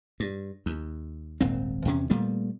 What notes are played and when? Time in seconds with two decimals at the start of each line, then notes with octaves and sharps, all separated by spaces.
0.20 G2
0.66 D#2
1.41 D#1 G#1 A#2 C4
1.85 E2 C3 C#4
2.10 A#2 G3 A3 B3